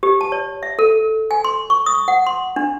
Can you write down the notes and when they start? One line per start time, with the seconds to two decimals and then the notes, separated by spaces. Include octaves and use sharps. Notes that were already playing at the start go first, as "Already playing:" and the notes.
0.03 G4
0.21 A5
0.32 C#5
0.63 E5
0.79 A4
1.31 G#5
1.44 C6
1.70 C#6
1.86 D#6
2.08 F#5
2.27 C6
2.56 D4